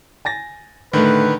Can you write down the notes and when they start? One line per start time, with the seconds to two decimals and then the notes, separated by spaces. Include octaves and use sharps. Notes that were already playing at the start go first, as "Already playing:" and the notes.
0.25 G#5 A6 A#6
0.93 A2 D3 D#3 A3 B4